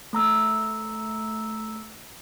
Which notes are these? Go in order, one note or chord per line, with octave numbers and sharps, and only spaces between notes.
A3 A#5 E6